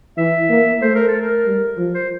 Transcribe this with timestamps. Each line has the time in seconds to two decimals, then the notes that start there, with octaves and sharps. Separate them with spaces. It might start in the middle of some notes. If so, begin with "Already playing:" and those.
0.17 E3 E5
0.50 A#3
0.82 A3 C5
0.95 A#4
1.08 A4
1.21 A#4
1.47 G3
1.78 F3
1.94 C5